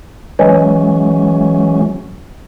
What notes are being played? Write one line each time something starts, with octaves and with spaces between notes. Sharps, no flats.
E3 F#3 G#3 C#4